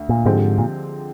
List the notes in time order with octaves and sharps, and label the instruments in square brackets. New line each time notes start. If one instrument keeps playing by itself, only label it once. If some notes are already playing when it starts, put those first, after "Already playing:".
Already playing: [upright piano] D2
[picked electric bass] A#2
[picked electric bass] G#2 [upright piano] D3 F3 G#3 C4 G4
[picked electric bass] A#2